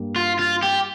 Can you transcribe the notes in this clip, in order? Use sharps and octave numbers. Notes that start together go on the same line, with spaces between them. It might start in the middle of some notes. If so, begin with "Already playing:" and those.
Already playing: G2 G3 A#3
F4
F4
G4